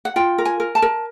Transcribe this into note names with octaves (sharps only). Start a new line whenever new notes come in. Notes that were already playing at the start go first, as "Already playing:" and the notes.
F#5
F4 G5
A#4
G#5
A#4
A5
A#4